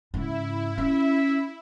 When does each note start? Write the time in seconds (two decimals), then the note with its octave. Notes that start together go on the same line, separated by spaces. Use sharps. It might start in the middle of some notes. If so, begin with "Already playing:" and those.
0.14 G#2 C#3 E4
0.78 C#4 E5